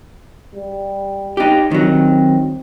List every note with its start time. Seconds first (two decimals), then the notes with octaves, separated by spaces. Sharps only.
0.55 G3
1.37 D#4 G4
1.71 D#3 F#3 C4